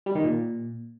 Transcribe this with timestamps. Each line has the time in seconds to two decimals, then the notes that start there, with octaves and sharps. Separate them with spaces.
0.06 G3
0.15 D#3
0.24 A#2